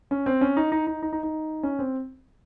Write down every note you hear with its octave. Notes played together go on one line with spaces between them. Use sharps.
C#4
C4
C#4
D#4
D#4
D#4
D#4
D#4
D#4
C#4
C4